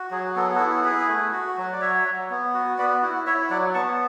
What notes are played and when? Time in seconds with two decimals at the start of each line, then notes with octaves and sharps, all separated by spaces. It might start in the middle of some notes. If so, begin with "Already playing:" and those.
Already playing: F#4
0.11 F#3 G#4
0.36 B3 A4
0.46 G#4
0.55 F#4 A4
0.60 E4
0.85 E4 G#4 B4
1.09 A3
1.32 F#4
1.58 F#3
1.73 D5
1.81 F#4 C#5 E5
2.05 F#3
2.30 B3
2.54 F#4
2.78 B3 B4 D5
3.03 E4 F#4
3.26 E4 C#5 E5
3.50 F#3 D5 F#5
3.75 B3 A5 C#6